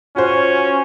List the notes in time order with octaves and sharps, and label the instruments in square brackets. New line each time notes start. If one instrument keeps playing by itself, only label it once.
[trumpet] C#4 [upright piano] F4 F#4 C5